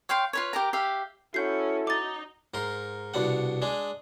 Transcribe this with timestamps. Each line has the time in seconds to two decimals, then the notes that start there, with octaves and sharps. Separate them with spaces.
0.09 C#5 F5 G5 C6
0.33 F4 B4 C#5
0.53 G4 A#4 A#5
0.73 G4 E5 F5
1.34 C#4 E4 F#4 A4 F#5 G6 C7
1.87 D#4 D6 A6
2.54 G#2 A#4 C6
3.14 C2 B2 D4 F#5
3.62 G#3 D4 G#4